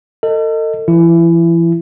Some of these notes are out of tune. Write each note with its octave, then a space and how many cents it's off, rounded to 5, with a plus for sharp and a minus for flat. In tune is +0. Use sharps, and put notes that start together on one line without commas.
A4 +40 D#5 +0
E3 +40 E4 +20